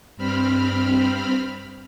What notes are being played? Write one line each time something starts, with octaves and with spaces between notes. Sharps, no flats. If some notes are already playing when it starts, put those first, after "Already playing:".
G2 C4 B5 F6